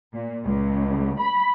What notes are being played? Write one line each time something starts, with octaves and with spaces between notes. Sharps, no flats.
A#2
C#2
B5